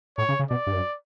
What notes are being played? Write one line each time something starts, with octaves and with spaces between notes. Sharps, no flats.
A2 C#5
C#3
C#3
B2 D5
G2
F#2